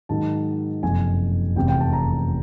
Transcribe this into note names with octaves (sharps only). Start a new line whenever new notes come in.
G#2 D#3 F#3 A5
F#1 F2 C3 G#5
F1 E2 C3 G5
G5
A5
A#5